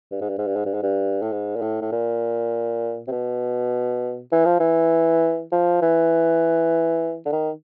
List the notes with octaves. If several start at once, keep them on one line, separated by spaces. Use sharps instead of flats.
G2
G#2
G2
G#2
G2
G#2
G2
G#2
G2
A2
G#2
A#2
A2
A2
A#2
C3
B2
E3
F3
E3
F3
E3
D3
D#3